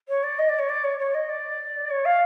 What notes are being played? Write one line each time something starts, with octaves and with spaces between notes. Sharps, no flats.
C#5
D5
D#5
D5
C#5
D5
C#5
C#5
D#5
D5
C#5
F5